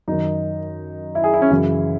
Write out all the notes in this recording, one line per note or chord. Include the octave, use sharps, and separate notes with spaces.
F#2 D#3 D#4
E4
G#4
E4
C#4
F#2 C#3 E3 E4